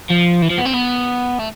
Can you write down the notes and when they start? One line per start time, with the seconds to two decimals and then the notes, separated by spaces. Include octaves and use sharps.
0.10 F3
0.42 E3
0.51 F3
0.58 B3
0.66 C4
0.74 B3
1.39 A3